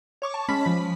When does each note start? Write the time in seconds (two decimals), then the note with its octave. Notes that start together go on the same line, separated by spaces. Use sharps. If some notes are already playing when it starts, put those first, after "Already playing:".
0.22 C#5 C#6 D6
0.34 A5
0.48 G#3 C#4 B5 B6
0.66 F3